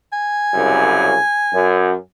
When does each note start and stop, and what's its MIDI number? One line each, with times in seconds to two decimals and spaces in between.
0.13 2.00 80
0.54 1.16 36
0.54 1.16 42
0.54 1.16 49
1.53 1.94 42